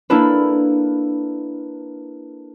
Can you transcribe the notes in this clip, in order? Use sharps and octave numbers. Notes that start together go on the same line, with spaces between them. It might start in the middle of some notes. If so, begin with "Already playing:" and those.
A#3 D4 E4 A4 B4